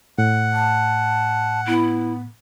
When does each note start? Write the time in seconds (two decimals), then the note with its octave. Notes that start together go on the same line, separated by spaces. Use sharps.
0.18 A2 F#5
0.53 A5
1.67 B3 E4